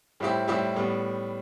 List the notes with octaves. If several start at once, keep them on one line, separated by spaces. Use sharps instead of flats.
A2 G3 C4 E4 G4
A2 G3 C4 E4 G4
A2 G3 B3